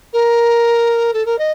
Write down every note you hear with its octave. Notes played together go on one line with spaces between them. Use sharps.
A#4
A4
A#4
D#5